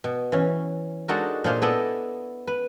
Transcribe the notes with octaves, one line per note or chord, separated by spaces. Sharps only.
B2
E3 C#4
G#3 D4 D#4 F#4 A4 A#4
A#2 A#3 D4 G#4 C5 F5
B3 E4 A4 D5 D#5
B4